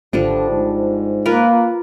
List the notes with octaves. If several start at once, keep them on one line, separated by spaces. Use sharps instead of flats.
G#1 D3 F3 G3 D4
G#2
A#3 F4 A#4 B4